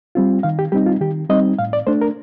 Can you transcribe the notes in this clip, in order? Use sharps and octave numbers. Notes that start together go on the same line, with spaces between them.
G3 C4 F4
D#3 F5
G4
G3 C4 D#4 G4
F4
D#3 G4
G3 C4 D#4 D#5
A2 F5
D5
A3 D4 C5
A#4